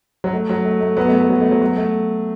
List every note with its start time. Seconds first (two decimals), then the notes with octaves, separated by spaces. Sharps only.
0.24 F#3
0.33 A3
0.49 F#3
0.65 A3
0.81 A3
0.97 F#3 B3
1.08 A3
1.19 A3
1.29 F#3
1.40 A3
1.51 F#3
1.62 F#3
1.77 A3